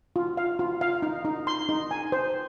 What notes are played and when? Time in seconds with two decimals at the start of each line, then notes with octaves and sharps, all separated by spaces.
0.16 F4
0.37 F5
0.59 F4
0.81 F5
1.02 D#4
1.25 D#4
1.47 C6
1.69 D#4
1.91 G#5
2.12 C5